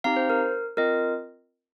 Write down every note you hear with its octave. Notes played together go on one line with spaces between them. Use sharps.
C4 D#4 G4 F5 A#5
C5
A#4
C4 F4 A#4 D#5